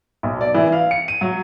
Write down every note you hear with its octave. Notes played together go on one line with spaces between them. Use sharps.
B1
D5
E3
F5
C#7
D#7
F#3